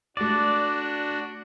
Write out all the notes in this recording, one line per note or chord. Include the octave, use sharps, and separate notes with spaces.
A3 D4 F#4 D5 E7